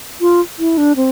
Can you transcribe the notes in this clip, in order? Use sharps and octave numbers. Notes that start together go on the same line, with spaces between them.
F4
E4
D4
C4